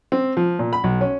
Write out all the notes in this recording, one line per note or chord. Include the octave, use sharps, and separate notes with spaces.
C4
F3
A#2
B5
B1
C#4